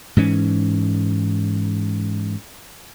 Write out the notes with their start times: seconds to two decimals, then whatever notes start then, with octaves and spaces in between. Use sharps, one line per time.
0.17 G#2 E3 C#4